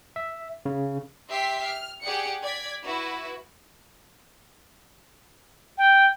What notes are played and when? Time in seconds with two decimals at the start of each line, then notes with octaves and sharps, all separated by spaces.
0.16 E5
0.66 C#3
1.29 G4 E5 C6 B6 C7
1.65 F6
2.02 G4 G#4 D5 F#5 G5 C#7
2.41 D5 G#6 B6
2.84 E4 F#4 B4
5.78 G5